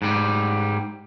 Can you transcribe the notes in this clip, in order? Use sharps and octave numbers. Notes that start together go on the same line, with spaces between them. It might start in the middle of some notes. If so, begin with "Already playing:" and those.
G#2 G3